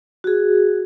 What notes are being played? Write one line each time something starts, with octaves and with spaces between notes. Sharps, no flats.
F#4 G#4